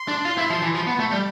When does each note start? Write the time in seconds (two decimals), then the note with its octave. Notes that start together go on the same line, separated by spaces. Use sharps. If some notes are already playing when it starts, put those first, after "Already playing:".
Already playing: C6
0.08 D4
0.25 F4
0.38 E4
0.50 F3
0.62 E3
0.75 F3 B5
0.84 B3 C6
0.92 B5
0.99 A3
1.11 G3